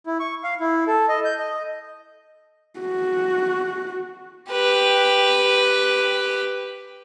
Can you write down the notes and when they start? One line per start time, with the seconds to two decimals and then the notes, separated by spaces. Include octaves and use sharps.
0.06 E4
0.20 C#6
0.44 F5
0.60 E4
0.87 A4
1.08 D#5
1.25 G6
1.39 D#5
2.80 F#4
4.51 G4 B4